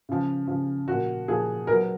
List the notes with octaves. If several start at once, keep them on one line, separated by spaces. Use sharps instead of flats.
C#3 F3
C#3 F3
A#2 F3 F#4
A#2 F3 G#4
B2 F#3 A#4